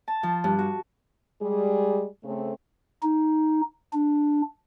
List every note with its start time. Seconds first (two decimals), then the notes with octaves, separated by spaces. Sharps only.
0.08 A5
0.23 F3
0.44 G2
0.59 F#4
1.42 G3 G#3 G#4
2.24 C#3 A3 C4
3.02 D#4
3.93 D4